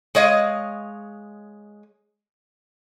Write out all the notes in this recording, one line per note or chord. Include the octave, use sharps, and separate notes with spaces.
G#3 C#5 D#5 F5